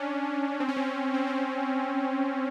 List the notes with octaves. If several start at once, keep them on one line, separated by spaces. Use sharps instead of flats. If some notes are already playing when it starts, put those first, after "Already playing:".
Already playing: C#4 D4
C4
C#4
C4
C4
C4